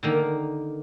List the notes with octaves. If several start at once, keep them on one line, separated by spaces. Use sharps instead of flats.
D3 D#3 A#3